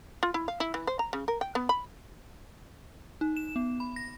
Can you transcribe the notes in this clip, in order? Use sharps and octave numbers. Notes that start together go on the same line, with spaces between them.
F4
E4
F5
E4
E3
C5
A#5
C#3
A#4
G5
B3
B5
D#4
E7
B3
B5
A#6